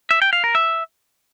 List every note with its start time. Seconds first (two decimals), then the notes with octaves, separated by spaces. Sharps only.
0.11 E5
0.22 G5
0.33 F5
0.44 A#4
0.55 E5